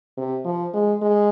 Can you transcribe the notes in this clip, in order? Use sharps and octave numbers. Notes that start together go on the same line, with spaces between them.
C3
F3
G#3
G#3